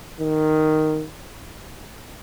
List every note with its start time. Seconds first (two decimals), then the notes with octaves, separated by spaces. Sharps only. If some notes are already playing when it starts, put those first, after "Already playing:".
0.20 D#3